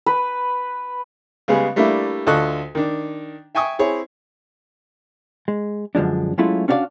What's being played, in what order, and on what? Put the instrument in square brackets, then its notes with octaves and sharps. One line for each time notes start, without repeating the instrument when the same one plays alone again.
[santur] B4
[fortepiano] C#3 G3 G#3 B3 G#4
G3 A3 A#3 D4 E4
D2 F4 A4 D#5 C#6 F#6
D#3 D4
E5 G5 G#5 C#6 D#6
C4 E4 G#4 C#5
[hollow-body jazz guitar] G#3
F#2 D3 F3 G#3 D4
F#3 G#3 A3 C#4 E4 F4
C#4 D4 F#4 G4 D5 F5